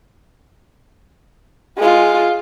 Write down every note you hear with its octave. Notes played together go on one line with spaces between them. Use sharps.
G#3 F4